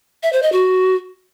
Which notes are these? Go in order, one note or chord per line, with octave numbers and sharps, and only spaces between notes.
E5
C5
D#5
F#4